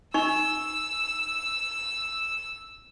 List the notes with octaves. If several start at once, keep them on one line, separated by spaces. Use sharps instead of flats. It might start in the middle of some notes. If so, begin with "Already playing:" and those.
D#4 C#6 E6